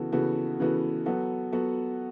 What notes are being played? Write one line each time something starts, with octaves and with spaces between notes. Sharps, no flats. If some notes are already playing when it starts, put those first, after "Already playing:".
Already playing: C#3 E3 B3 F#4 A4
C#3 E3 B3 F#4 A4
C#3 E3 B3 F#4 A4
F#3 B3 F#4 A4
F#3 B3 F#4 A4